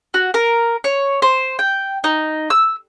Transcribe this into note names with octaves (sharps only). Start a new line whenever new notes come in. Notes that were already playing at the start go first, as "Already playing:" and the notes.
F#4
A#4
C#5
C5
G5
D#4
E6